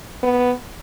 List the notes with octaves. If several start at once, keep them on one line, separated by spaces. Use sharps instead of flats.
B3